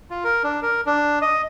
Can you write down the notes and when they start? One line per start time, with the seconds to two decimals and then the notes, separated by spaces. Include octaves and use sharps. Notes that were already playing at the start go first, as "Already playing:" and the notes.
0.10 F4
0.24 A#4
0.44 D4
0.62 A#4
0.86 D4
1.22 D#5